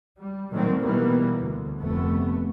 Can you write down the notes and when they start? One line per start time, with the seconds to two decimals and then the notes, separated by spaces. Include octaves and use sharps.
0.19 G3
0.51 A#2 D#3 F#3 A3 A#3 C4
0.81 B2 E3 G3 A#3 B3
1.39 D2
1.77 F1 A3 B3